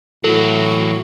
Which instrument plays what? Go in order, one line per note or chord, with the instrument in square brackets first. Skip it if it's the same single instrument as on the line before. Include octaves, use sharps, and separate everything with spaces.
[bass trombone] A2 [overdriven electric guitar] E3 F#3 [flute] F#4 [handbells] A4